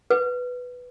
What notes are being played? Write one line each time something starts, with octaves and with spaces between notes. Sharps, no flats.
B4